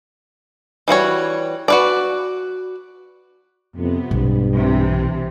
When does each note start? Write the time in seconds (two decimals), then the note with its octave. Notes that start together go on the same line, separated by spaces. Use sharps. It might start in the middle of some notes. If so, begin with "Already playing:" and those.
0.88 E3 G3 F#4 C#5
1.68 F#4 B4 D5
3.76 F2 C3 B3
4.11 B1 G2
4.56 C3 E3